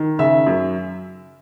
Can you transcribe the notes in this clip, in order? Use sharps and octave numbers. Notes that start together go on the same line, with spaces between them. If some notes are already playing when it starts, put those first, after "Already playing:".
Already playing: D#3
C#3 E5
F#2